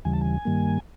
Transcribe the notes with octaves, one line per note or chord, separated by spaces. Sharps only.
D#2 C#3 E3 G3 G#5
A5
G#5
G2 D#3 G3 A#3